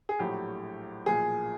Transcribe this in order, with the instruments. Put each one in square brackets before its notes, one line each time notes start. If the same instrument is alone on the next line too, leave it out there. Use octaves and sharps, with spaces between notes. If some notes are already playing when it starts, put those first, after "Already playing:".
[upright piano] G#4
A#1 A2 F#3 G4
B1 A#2 F3 G#4